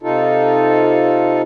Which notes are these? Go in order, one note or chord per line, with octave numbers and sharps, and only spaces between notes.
C3 D#4 F4 A4